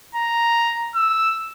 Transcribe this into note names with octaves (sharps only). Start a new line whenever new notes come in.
A#5
E6